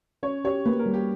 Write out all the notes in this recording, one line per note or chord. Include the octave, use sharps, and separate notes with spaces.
C#4 C#5
G4 C#5
A#3 B4
A#4
G3
G4